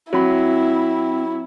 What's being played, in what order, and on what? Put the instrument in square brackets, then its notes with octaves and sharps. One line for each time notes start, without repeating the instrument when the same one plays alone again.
[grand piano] F#3 B5 [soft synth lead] C4 [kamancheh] E4